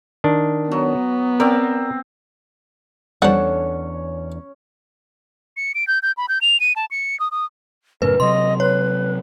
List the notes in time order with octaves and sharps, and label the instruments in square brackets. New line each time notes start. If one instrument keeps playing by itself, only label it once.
[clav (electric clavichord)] D#3 D4
[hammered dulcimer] F#3 [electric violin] B3
[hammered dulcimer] C4 [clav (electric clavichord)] A#4 D5
[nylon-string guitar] E2 D4 A4 [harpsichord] F3 G3 [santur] C#4 C#5 [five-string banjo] F#5
[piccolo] C#7
D7
G6
G6
B5
G6
F7
D#7
A5
C#7
D#6
D#6
[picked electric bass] F#2 A2 C#3 [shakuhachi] A#4 [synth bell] B4
[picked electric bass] C3 F#3 [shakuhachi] D#5 [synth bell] C6
[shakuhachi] B4 [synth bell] C#5